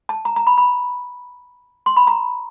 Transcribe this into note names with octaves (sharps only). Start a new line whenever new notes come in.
A5
A#5
A#5
B5
B5
C6
B5
A#5